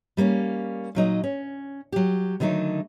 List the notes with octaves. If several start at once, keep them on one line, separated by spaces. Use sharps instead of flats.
G3 A#3 C4 C#4
A#2 F#3 D#4 D#5
C#4
F#3 G4
D3 D#3 F#3 A3 D#4